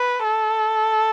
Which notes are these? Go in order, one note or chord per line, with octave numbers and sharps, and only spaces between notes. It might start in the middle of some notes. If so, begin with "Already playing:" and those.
Already playing: B4
A4